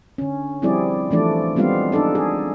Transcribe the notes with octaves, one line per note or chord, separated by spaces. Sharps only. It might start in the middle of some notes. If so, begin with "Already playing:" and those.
D3 C#4
F3 G3 C4 E4 G#4 D5
E3 F3 A3 D4 D5
G3 G#3 B3 C4 F4 F5
D4 D#4 A4 D5
G#4